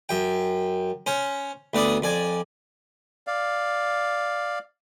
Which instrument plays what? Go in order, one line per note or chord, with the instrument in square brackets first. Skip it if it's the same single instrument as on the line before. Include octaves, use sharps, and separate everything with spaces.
[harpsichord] F#2 G5
C#4 C5
D2 B3 D5 C6 D#6
F2 D5 G#5
[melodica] D5 F5